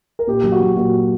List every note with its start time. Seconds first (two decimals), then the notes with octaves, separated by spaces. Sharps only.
0.19 A#4
0.27 A#2 G4
0.44 F#3
0.52 F#4
0.60 F#3
0.76 A#2 F#4